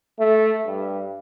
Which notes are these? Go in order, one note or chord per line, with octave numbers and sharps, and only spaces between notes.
A3
G2